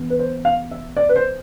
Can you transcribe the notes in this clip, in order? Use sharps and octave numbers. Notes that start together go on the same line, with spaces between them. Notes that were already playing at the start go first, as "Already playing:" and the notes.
Already playing: E3 B3
B4
C5
F5
E5
D5
B4
C5